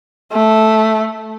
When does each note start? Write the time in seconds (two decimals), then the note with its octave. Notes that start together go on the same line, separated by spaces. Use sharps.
0.32 A3